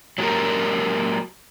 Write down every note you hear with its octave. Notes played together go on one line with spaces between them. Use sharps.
F#3 G#3 A#3 F#4 G4 A#4